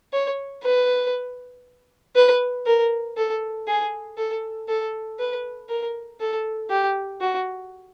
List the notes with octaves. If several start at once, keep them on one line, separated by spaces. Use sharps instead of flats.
C#5
B4
B4
A#4
A4
G#4
A4
A4
B4
A#4
A4
G4
F#4